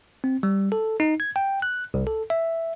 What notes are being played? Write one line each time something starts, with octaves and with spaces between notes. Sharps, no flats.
C4
G3
A4
D#4
G#6
G5
F#6
C2
A4
E5